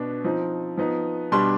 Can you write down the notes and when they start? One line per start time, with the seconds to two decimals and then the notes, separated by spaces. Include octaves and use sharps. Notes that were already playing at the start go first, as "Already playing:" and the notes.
Already playing: B2 B3 D4
0.24 F3 C4 D#4
0.77 F3 B3 D#4
1.32 B2 G3 D4 C6